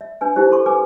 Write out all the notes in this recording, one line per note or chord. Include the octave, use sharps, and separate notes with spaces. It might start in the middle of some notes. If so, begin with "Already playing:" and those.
E5
D4 B4 G#5
D#4 E4 G4 C5
A4 C6 C#6
A4 B4 G#5 D6